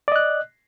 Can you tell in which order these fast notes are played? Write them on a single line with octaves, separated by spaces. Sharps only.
D5 D#5 F#6